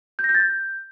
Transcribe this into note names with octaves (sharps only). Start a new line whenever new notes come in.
G6
A#6
G6
A6
G6